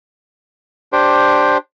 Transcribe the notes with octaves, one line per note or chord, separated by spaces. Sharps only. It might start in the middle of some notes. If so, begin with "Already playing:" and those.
D4 G4 C5